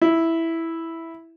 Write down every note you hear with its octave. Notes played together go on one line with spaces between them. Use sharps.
E4